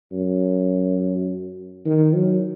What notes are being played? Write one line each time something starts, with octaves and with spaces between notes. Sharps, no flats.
F#2
D#3
F#3